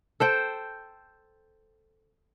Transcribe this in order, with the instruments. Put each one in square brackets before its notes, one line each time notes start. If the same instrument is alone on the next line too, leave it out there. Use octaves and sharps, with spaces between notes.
[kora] A4 C5 G5